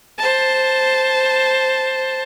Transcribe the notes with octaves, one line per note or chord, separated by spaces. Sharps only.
C5 A5